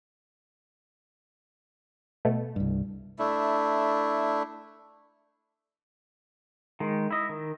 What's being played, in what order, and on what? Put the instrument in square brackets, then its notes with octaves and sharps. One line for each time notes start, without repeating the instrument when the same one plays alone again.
[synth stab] B2 A3
[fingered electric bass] C2 G2
[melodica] A3 D4 E4
[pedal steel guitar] D#3 G#3
E4 D#5
D#3